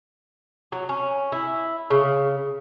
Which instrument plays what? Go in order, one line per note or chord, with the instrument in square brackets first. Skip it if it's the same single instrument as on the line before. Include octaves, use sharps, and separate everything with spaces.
[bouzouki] F#3
C#4
E4
C#3